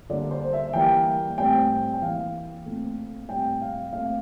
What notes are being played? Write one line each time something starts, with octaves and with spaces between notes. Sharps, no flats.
D3 G3 A#3 D5
C5
E5
E3 G3 A#3 G5
A2 G3 C4 G5
G5
E3 A#3 F5
A#2 A3 C4
A2 G3 C4 G5
F5
A#2 A3 C4 F5